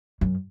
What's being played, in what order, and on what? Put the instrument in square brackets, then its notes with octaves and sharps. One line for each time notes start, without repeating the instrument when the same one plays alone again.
[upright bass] F#2